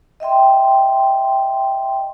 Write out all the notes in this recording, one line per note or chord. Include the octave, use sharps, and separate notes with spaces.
D#5 E5 G5 C6